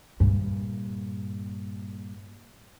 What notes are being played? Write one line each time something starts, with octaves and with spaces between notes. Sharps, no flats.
G2 A#2